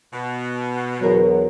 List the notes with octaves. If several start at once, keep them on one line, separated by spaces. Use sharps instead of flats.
B2
E2 D3 F#3 A#4